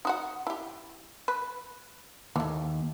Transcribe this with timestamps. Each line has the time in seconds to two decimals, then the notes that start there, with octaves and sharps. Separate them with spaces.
0.05 D#4 F#4 F#5
0.47 E4 G4
1.28 B4
2.36 D#2 E3 A3